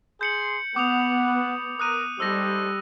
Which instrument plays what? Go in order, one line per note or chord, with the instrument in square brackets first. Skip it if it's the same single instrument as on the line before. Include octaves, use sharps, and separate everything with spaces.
[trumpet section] G#4 C6 [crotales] G6 C#7 F#7
[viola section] B3 [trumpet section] F#5 [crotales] D6 D#6 F7
[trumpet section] A#4 [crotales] D#6 F#6 D#7
[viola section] G3 [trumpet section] D#4 A4 C5 [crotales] E6 A#6